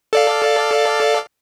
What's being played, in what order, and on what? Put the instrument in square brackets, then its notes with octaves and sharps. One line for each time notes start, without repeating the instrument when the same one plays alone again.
[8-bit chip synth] A4 D5 F5